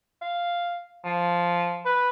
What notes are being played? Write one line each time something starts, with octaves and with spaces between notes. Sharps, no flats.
F5
F3
B4